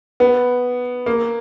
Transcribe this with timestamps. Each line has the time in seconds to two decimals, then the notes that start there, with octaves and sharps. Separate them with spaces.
0.20 B3
1.06 A#3